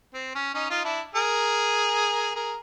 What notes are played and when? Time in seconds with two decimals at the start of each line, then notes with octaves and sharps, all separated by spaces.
0.14 C4
0.35 C#4
0.54 C#4 D#4
0.70 D#4 F4
0.84 D4 E4
1.15 G#4 A#4
2.35 G#4 A#4